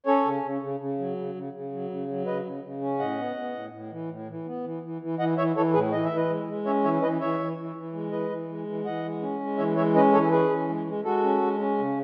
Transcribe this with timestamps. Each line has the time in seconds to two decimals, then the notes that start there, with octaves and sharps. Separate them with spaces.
0.06 C#4 A4 C#5
0.25 C#3
0.43 C#3
0.61 C#3
0.80 C#3
0.99 F#3
1.17 C#3
1.35 C#3
1.53 C#3
1.71 F#3
1.90 C#3
2.08 F#3
2.26 C#3 B4 D#5
2.45 C#3
2.63 C#3
2.81 C#4
2.99 A2 D#5 F#5
3.19 B3
3.36 B3
3.54 A2
3.72 A2
3.91 E3
4.09 A2
4.28 E3
4.47 B3
4.64 E3
4.83 E3
5.02 E3
5.19 E3 D#5 F#5
5.37 E3 C#5 E5
5.56 E3 A4 C#5
5.74 A2 G#4 B4
5.92 E3 D#5
6.05 E5
6.11 E3
6.16 B4 D#5
6.30 G#3
6.48 G#3
6.66 C#4 C#5 E5
6.84 E3 C#5 E5
7.02 E3 B4 D#5
7.20 E3 C#5 E5
7.39 E3
7.57 E3
7.76 E3
7.94 G#3
8.12 E3 B4 D#5
8.30 E3
8.49 G#3
8.67 E3
8.85 E3 D#5 F#5
9.03 G#3
9.22 C#4
9.40 G#3
9.58 E3 C#5 E5
9.77 G#3 C#5 E5
9.95 C#4 B4 D#5
10.13 E3 A4 C#5
10.31 C#4 G#4 B4
10.50 E3
10.68 G#3
10.87 G#3
11.04 G#3 F#4 A4
11.23 C#4
11.42 G#3
11.59 C#4
11.78 C#3